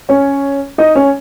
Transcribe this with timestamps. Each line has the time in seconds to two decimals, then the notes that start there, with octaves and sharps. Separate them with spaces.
0.09 C#4 C#5
0.78 D#4 D#5
0.95 C#4 C#5